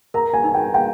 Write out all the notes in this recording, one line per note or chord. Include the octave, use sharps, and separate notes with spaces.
A#4 A#5
G#5
D#4
G5
F5 G5